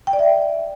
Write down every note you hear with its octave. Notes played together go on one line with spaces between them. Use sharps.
G5
D5
E5